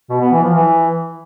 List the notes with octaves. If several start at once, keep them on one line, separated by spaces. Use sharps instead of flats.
B2
B3
E3
F3
E3